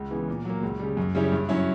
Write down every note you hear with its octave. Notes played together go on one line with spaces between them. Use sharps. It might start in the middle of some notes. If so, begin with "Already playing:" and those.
Already playing: C#2
C#3 E3 B3
A#2
F#3 A#3
C#2
C#3 G3
F#2
C#3 G3 C#4 E4
G2
F#3 C#4 E4